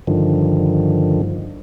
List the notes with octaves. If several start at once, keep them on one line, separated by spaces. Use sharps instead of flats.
G2 D3 D#3 F3